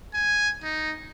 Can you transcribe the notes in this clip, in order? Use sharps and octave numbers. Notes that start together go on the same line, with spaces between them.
G#5
D#4